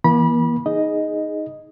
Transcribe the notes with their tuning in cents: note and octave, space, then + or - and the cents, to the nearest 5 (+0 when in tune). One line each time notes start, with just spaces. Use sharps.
E3 +0 A#3 +40 B5 -30
D#4 +0 G#4 +0 D#5 +0